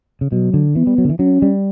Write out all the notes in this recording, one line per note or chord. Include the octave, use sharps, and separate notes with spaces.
C#3
B2 F#3
D3
E3 B3
G3
F#3
D3
E3
F#3 C#4
G3